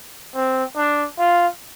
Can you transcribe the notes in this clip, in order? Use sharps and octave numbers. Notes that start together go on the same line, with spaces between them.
C4
D4
F4